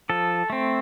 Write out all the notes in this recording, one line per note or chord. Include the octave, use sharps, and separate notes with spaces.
F3 A4
A3 C4